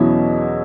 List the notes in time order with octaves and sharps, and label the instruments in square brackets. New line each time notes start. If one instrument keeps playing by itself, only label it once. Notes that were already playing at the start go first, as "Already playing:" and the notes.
Already playing: [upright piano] E2 B2 F#3 C#4 E4